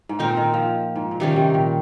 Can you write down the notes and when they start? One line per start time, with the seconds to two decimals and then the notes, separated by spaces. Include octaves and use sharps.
0.09 G#2
0.19 A#2 C4 D#4 A#4
0.37 D#3
0.54 F3
0.96 G#2
1.11 A#2
1.20 C3 D#3 G3 C#4
1.36 C3
1.54 A#2